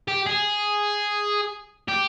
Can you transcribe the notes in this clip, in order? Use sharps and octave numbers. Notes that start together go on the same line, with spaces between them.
G4
G#4
G4